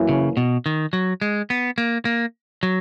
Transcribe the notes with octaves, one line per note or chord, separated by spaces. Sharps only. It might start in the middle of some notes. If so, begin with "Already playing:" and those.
Already playing: F#2 E3 A#3 C#4 E4
C#3
B2
D#3
F#3
G#3
B3
A#3
A#3
F#3